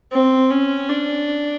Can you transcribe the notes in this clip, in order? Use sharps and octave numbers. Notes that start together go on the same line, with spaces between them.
C4
C#4
D4